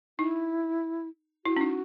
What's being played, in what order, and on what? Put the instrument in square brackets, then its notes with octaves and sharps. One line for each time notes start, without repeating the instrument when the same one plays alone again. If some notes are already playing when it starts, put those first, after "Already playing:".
[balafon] D#4 [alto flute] E4
[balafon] E4 [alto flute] F#4
[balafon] C#4
D#4